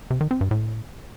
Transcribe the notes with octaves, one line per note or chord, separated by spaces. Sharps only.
C3
D#3
C4
G2
A2